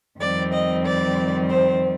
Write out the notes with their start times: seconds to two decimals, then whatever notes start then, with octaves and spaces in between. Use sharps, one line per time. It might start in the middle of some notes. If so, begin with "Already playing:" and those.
0.20 F2 D#3 G3 C4 D5
0.53 D#5
0.85 D5
1.49 C5